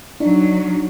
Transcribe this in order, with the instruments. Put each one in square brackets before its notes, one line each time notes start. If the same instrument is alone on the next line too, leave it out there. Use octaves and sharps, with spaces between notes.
[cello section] F#3 [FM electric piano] D4 D#4